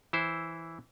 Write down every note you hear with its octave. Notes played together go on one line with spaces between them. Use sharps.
E3 E4 C5